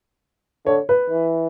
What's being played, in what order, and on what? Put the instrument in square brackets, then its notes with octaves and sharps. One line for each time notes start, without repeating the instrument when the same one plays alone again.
[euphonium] D3 [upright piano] C#5
[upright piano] B4
[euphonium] E3